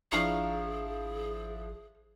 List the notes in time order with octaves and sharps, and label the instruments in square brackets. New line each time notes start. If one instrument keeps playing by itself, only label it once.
[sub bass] G#1 [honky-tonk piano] F3 D4 E4 [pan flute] G#4 [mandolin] F5 A#5 C#6